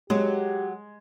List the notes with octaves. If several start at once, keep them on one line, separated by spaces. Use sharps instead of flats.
F#3 G#3 G4